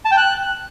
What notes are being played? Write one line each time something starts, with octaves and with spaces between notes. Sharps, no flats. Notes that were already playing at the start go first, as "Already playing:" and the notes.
A5
G5
F#6